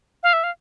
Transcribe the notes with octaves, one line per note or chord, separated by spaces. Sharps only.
F5
E5
F5